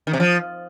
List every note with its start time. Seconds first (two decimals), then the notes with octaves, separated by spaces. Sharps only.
0.07 D#3
0.13 C3
0.20 F3